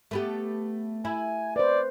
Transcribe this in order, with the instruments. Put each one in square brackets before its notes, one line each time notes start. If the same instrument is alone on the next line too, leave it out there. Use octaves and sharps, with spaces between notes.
[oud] A3 B3 G4
[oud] E4 [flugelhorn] G#5
[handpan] B4 C5 [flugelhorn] D5